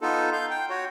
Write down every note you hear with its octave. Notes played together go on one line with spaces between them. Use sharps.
B3 D#4 F4 A4
F5 G6
G5
F#4 C#5